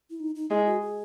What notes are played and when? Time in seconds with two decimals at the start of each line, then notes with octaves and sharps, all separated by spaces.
0.11 E4
0.20 D#4
0.36 D#4
0.51 G#3 E4
0.66 F#4
0.81 G#4